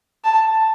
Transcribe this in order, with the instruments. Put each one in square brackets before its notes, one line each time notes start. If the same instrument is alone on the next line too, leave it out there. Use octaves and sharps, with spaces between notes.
[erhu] A5